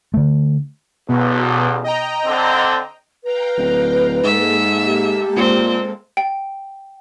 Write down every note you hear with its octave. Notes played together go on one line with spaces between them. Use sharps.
D3 A3
A1 E2 B2
D#5 G5 A#5
D3 C4
B4 F5 G5 A#5
D1
G#2 G#3 A#3 A4 E5
G4
A#2 C4
G5